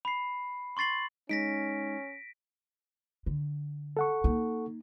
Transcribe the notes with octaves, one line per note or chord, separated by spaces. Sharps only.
B5 C7
C6 C#6 A6 C7 F#7
G#3 C#4 D#4 A#6 B6 D7
D3
A4 F#5 C#6
A#3 D#4